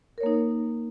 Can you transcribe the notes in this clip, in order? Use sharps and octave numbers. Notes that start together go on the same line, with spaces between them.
A#3 D#4 A#4 C#5